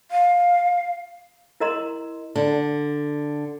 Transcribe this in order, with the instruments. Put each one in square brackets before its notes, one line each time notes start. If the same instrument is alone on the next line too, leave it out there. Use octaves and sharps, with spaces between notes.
[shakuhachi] F5
[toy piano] E4 A#4 D#5 A#5 C6
[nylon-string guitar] D3